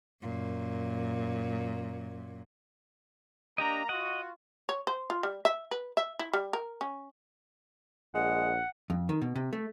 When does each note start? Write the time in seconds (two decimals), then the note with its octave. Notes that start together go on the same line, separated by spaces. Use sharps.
0.22 F#2 A#2
3.58 A#3 D4 G4 D#5 A#5
3.89 F4 F#4 D#5 F#5
4.69 C#5
4.87 C5
5.10 F4
5.23 G3
5.45 E5
5.71 B4
5.97 E5
6.19 E4
6.33 G3
6.53 A#4
6.81 C#4
8.15 A#1 G#3 F#5
8.90 F2
9.09 D#3
9.22 B2
9.35 C3
9.53 A3